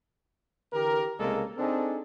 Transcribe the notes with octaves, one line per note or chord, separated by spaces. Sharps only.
D3 E3 G4 A#4
C2 C#3 G#3 A#3 A4
C4 D4 D#4 G#4 A4